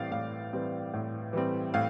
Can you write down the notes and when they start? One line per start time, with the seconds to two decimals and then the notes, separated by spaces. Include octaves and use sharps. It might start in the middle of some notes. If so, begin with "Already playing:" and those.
Already playing: A2 E3 G3 C4 D5 F5
0.11 A2 F5
0.53 E3 G3 C4
0.94 A2
1.33 E3 G3 C4
1.74 A2 F5